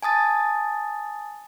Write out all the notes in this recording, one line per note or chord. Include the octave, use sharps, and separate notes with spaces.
G#5 A5 D#6 A6